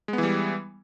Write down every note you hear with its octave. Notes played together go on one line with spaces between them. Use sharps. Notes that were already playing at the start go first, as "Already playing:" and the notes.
E3 G3 G#3 B3